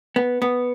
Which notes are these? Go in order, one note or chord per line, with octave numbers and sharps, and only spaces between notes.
B3
B3